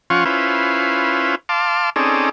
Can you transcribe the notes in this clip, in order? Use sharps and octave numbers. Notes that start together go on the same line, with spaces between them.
F3 C#4 F4 F#5 C#6
C#4 E4 F4 B4 C5
F5 A5 C6 D6
C4 C#4 D#4 G#4 A4 D5